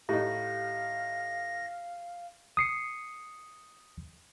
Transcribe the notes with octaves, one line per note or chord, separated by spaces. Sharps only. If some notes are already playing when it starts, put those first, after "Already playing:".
A2 D#4 G4 F5 A#6
D#6 C7 C#7